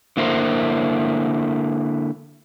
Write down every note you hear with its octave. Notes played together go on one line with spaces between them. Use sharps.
D3 A#3 E4 A#4 C5